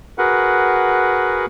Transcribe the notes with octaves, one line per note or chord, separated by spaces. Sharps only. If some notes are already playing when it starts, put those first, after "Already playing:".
F#4 G#4 A#4 B4 F#5